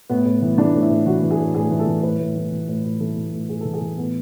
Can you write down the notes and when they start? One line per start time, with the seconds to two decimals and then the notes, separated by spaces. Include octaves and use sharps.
0.09 A2 B3
0.25 A2
0.42 E3
0.58 E3 D4
0.74 A2
0.82 E4
0.90 A2
1.06 E3 F#4
1.23 E3
1.31 G#4
1.39 A2
1.55 A2 G#4
1.71 E3
1.79 A4
1.87 E3
2.03 A2 B4
2.20 A2
2.36 E3
2.52 E3
2.68 A2
2.85 A2
3.00 E3 A4
3.17 E3
3.33 A2
3.49 A2 G#4
3.61 A4
3.65 E3
3.74 G#4
3.81 E3 A4
3.97 A2 B3